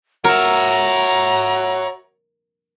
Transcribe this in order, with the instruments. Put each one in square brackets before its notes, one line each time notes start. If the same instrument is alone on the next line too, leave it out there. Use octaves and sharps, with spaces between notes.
[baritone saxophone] F#4 [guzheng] A#4 [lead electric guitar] C#5 E5 [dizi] A#5